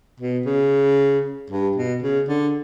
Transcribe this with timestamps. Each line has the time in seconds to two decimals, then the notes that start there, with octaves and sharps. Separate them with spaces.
0.20 B2
0.46 C#3
1.50 G2
1.76 B2
2.02 C#3
2.29 D3